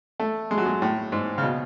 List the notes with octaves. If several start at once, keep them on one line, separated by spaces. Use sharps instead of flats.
A3
G#3
F#3
G#3
A2
G#2
C#3
B2